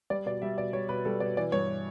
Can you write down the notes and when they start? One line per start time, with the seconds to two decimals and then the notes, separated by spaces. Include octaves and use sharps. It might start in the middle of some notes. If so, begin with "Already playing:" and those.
0.10 G3 D5
0.26 B2 D5
0.42 G3 E5
0.58 B2 D5
0.73 G3 C#5
0.89 B2 B4
1.05 G3 A4
1.20 B2 D5
1.37 E3 D5
1.52 G2 C#5